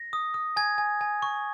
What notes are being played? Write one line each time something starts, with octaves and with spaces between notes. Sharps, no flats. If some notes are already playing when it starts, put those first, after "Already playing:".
Already playing: A#6
D#6
D#6
G#5 G#6
G#5
G#5
C#6